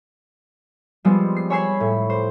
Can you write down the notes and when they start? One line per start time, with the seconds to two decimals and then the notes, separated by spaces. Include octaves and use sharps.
1.05 F3 G3 G#3 B3 C4
1.36 C7
1.50 C#5 G#5 B5 E6 G#6 C7
1.80 A2
2.10 C5